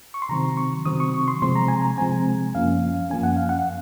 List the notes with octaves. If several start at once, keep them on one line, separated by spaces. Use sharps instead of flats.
C#6
C6
C3 D#3 F#3 C4 A#5
C#6
C3 D#3 F#3 C4 D#6
C#6
C#6
C6
C3 F3 G#3 C4 C6
A#5
G#5
A#5
C3 F3 G#3 C4 G#5
F#2 F3 A#3 C#4 F5
F#2 F3 A#3 C#4 G#5
F#5
F5
F#5